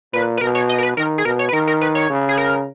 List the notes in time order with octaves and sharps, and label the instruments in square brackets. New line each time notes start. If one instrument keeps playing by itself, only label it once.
[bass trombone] A#2 [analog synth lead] B4
[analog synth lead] B4
[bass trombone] B2 [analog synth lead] A#4
[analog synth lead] C#5
D#5
A#4
B4
[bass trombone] D#3 [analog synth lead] A#4
[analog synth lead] G#4
[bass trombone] B2 [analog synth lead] A#4
[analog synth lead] C#5
B4
[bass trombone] D#3 [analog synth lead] A#4
[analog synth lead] A#4
B4
C#5
[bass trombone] C#3
[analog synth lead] G#4
A#4